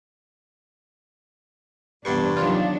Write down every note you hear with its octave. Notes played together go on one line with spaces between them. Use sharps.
G1 E2 G2 C3 D4 C6 C#6
D#3 F#3 D4 F4